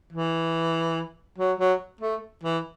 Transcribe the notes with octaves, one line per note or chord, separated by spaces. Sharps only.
E3
F#3
F#3
A3
E3